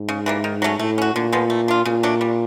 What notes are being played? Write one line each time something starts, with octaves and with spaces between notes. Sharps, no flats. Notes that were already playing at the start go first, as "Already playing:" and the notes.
Already playing: G#2
C#3
E3 G3 A#3
D#3
F#3 A3 C#4
A2 A3
C#4 F#4
A#2 D3
F3 G#3 B3
A3
D4 F4
A#2 C#3
F#3 A3 D4
G3